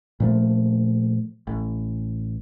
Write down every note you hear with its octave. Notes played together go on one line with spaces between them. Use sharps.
A#2 F3 A3
A1